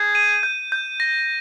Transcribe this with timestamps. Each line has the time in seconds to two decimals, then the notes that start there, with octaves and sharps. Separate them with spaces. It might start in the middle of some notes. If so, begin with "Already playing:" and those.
Already playing: G#4 G6
0.15 D#7
0.43 G6
0.72 G6
1.00 A#6